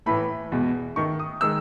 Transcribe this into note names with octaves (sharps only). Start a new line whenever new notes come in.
A2 E3 A3 B5
E2 B2 G#3
D#3 A3 D#4 C#6
D#6
D#3 G#3 E6